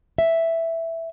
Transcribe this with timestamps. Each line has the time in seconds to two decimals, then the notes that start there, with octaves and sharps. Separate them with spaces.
0.18 E5